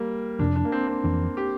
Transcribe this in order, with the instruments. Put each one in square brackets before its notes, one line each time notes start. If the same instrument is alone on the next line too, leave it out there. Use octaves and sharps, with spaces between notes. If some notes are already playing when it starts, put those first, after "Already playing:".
Already playing: [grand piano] G3 A#3
[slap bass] F2 C3 F3 A3 [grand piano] D4
[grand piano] D4
A#3
C4
C4
[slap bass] F2 E3 A#3 D4
[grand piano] G4